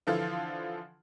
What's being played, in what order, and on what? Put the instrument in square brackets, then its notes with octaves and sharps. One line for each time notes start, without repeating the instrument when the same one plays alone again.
[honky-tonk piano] D3 E3 F3 F4 A4